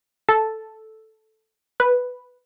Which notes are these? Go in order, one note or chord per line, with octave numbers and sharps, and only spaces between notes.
A4
B4